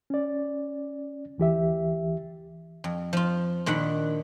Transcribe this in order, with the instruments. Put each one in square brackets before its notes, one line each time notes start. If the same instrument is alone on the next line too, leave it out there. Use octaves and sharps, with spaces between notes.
[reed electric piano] C#4 D5
D2 E3 G4 E5
[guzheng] F2
F3 F4
A#2 D#3 D4 F#5 B5